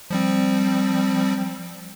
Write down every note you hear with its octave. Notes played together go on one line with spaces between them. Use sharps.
F3 G3 C4